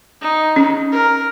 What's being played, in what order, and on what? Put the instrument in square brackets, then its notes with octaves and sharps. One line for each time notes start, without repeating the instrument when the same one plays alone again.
[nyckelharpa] D#4
[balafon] C#4
[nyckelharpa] A#4